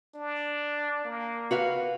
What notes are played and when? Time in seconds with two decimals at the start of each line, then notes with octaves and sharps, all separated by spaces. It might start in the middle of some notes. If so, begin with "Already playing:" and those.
0.15 D4
1.05 A#3
1.51 F#4 B4 F5